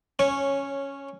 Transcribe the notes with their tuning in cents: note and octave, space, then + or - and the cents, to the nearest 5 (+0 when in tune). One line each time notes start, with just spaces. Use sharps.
C#4 +0 C#5 -10